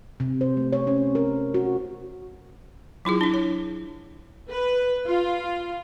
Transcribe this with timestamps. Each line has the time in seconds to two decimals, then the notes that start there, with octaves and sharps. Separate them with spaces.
0.20 C3
0.41 C5
0.57 A3
0.73 C#5
0.87 C#4
1.15 A#4
1.54 F#4
3.05 F#3 E4 F4 G#4
3.21 D4 E4
3.34 C#5
4.49 B4
5.06 F4